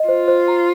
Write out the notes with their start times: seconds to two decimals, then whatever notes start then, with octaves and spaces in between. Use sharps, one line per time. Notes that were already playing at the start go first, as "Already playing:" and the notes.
Already playing: D#5
0.09 F4 C5
0.28 C5
0.48 A#5